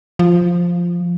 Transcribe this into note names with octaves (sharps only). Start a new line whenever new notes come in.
F3